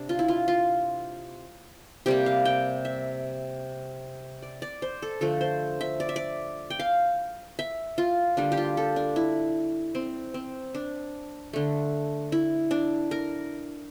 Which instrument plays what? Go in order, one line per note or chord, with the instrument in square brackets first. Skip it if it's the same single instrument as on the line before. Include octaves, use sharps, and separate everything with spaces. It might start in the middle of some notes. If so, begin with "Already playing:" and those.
Already playing: [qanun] C3 D4
F4
E4
F4
F4
C3 G3 A#3 G4
F5
G5
E5
D5
D5
C5
A4
D3 F3 A3 A4
C5
E5
D5
E5
D5
G5
F5
E5
F4
D3 G3 A#3 D4
G4
F4
A4
D4
E4
C4
C4
D4
D3 A3
E4
D4
A#4